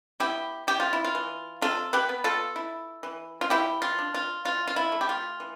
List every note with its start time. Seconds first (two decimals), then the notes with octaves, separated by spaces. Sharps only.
0.20 B3 E4 G4
0.67 E4 G4
0.80 F4
0.93 E4
1.04 F4
1.15 E3
1.61 C3 F4 A4
1.93 G4 B4
2.09 B3
2.24 F4 A4
2.56 E4
3.03 E3
3.41 F4
3.50 E3 E4 G4
3.82 F4
3.99 D4
4.14 F4
4.45 E3 F4
4.67 F4
4.76 E4
4.92 A3
5.01 G4
5.09 F4
5.40 E3